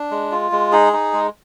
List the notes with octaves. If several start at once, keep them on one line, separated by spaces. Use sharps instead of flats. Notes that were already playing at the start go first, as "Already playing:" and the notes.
Already playing: D4
G#3
F4
G#3
D#4 G#4
D#4
G#3